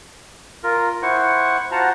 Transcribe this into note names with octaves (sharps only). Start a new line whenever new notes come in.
F4 A#4
E4 C5 F#5 C#6
F4 F#4 C5 F#5 A5 A#5